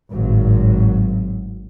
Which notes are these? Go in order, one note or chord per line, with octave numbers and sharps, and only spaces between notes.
G#1 A2 F#3